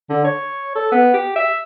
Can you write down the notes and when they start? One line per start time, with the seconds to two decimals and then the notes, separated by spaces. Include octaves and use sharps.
0.10 D3
0.24 C#5
0.75 A4
0.92 B3
1.14 G4
1.36 E5